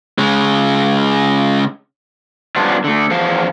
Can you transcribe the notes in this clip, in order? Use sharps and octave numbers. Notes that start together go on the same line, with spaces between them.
C#3 G#3
F3 G3 B3 C#4 D4 F4
D3 A3
E2 F3 F5